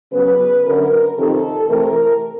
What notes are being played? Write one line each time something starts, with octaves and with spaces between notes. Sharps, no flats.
C#3 F#3 B3 B4
F#2 D3 F#3 A#4
F2 C3 D#3 A4
C3 E3 A3 A#4